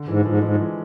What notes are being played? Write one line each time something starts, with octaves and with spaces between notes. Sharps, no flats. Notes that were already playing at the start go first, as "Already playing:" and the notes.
Already playing: D3
G#2 E3
G#2 F3
G#2 G#3
E3